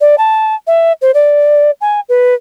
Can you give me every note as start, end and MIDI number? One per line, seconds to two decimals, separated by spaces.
0.01 0.16 74
0.18 0.55 81
0.67 0.93 76
1.02 1.11 72
1.14 1.71 74
1.81 2.00 80
2.09 2.34 71